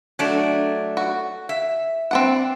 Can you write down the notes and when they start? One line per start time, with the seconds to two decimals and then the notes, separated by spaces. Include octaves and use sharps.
0.19 F#3 A3 D4
0.97 F#4
1.49 E5
2.11 C4 D4 F#5